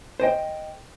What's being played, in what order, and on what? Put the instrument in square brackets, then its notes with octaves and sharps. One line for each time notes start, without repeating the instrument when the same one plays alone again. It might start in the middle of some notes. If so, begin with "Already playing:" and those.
[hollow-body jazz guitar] C5 D#5 G5